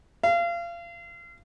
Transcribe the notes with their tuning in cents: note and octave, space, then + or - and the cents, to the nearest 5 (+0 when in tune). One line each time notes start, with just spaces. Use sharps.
F5 -30